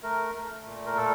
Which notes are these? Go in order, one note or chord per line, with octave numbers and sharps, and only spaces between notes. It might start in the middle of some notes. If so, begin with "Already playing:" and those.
A3 A#4
A3
A#2
A#4
A#2 A4